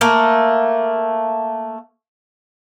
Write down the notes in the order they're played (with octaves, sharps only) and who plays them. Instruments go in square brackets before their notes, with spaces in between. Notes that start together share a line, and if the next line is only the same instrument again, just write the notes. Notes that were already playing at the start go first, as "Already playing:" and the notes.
[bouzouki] A3 A#3